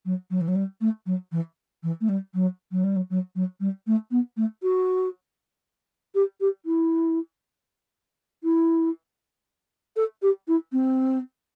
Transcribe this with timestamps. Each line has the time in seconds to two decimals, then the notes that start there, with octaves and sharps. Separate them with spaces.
0.05 F#3
0.30 F#3
0.41 E3
0.48 F#3
0.55 G3
0.81 A3
1.06 F#3
1.32 E3
1.83 E3
2.01 A3
2.09 G3
2.34 F#3
2.71 F#3
2.84 G3
2.96 F#3
3.10 F#3
3.35 F#3
3.60 G3
3.87 A3
4.11 B3
4.37 A3
4.62 F#4
6.14 G4
6.40 G4
6.65 E4
8.43 E4
9.96 A4
10.22 G4
10.48 E4
10.72 C4